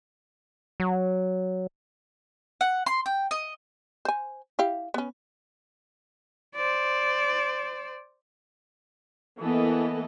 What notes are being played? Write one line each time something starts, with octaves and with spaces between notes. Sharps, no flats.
F#3
F#5
C6
G5
D#5
C5 G#5
E4 G4 F5
B3 C#4
C5 D5
E3 A#3 B3 A4 D#5